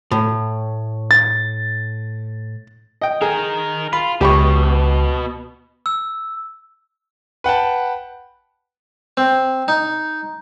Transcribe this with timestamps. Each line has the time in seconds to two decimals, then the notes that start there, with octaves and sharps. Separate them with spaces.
0.11 A2
1.11 A6
3.01 D#5 G5
3.22 D#4 G#4 A#4
3.93 F4 B5
4.21 C#2 B2 G4 B5 C#6
5.86 E6
7.44 B4 F#5 G5 A5
9.17 C4
9.68 D#4